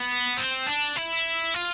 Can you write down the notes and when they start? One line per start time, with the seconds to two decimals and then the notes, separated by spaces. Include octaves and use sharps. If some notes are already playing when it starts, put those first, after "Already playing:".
Already playing: B3
0.37 C4
0.67 D4
0.96 E4
1.54 F4